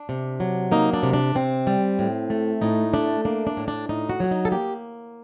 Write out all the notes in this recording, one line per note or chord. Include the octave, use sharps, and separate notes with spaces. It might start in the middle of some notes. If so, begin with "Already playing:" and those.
Already playing: D4
C3
F#3
A#3 D#4
D4
C3
D4
C3 C4
G3
A2
A3
A2 D#4
A3 D4
A#3 D4
D4
A2
D4
A2 D#4
F#4
F#3 F#4
D#4
A4
A#3 G4